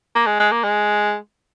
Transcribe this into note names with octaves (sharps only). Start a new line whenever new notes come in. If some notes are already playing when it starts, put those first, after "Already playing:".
A#3
G#3
G#3
A#3
G#3